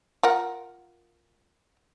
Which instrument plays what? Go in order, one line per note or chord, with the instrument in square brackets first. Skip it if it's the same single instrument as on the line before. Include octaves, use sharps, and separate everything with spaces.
[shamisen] F4 A#4 F#5